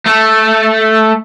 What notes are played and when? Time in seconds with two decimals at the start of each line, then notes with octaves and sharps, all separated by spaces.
0.06 A3